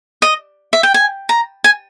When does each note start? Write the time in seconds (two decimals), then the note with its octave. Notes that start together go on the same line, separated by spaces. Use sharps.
0.22 D#5
0.73 E5
0.83 G5
0.94 G#5
1.29 A#5
1.64 G#5